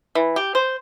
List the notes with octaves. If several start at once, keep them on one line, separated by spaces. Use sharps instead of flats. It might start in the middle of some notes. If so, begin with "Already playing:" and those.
E3
G4
C5